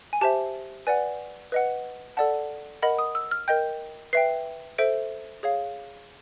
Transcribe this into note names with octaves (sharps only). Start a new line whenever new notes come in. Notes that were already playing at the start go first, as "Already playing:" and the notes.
G#5
G4 C5 E5 A5
B4 D5 F#5 G#5
B4 D#5 F#5
A4 D5 F#5 A5
A#4 D#5 F#5 B5
D#6
E6
F6
A#4 D#5 G5 G6
B4 E5 G5 C7
A4 C5 E5 D7
G#4 C#5 F5